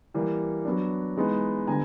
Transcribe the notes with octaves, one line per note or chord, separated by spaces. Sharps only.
E3 G3 A#3
F#3 B3 D4
E3 G#3 B3 D#4
D3 G3 B3 G#5 A#5